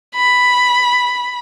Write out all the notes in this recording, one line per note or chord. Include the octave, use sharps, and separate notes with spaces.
B5